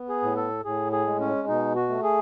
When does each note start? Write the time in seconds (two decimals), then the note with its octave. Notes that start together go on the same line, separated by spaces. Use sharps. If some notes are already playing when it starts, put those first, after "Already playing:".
Already playing: B3
0.09 G#4
0.22 A2
0.36 A4
0.65 A2 G#4
0.92 G#4
1.07 G#3
1.20 C#4
1.48 B2 D#4
1.75 F#4
1.89 A3
2.03 G#4